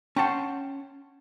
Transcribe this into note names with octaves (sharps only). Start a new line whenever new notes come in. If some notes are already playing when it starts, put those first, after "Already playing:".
C#4 F#5 G5 A5 C6